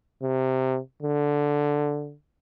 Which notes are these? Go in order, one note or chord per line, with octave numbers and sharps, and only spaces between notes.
C3
D3